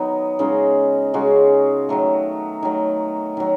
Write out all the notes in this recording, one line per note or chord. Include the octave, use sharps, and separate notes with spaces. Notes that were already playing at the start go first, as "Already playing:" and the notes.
Already playing: D#3 F#3 B3 D#4
C#3 G#3 D#4 F#4
C#3 G#3 D#4 F#4
D#3 F#3 A3
D#3 F#3 A3
D#3 F#3